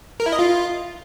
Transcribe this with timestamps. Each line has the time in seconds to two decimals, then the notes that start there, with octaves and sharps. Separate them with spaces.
0.20 A#4
0.26 E4
0.32 D#5
0.39 F4